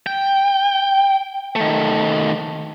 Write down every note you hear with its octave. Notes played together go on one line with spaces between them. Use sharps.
G5
D#3 A3